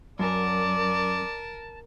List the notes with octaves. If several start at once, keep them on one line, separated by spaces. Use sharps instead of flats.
F#2 A#4 D5 A5